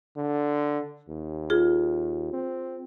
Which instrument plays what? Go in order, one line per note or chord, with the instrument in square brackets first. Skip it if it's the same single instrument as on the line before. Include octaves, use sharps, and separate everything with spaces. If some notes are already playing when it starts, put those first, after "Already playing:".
[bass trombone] D3
D#2
[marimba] F4 G#4
[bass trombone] C4